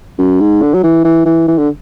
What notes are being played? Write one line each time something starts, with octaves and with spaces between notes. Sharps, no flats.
F#2
G#2
D3
F#3
E3
E3
E3
E3
D3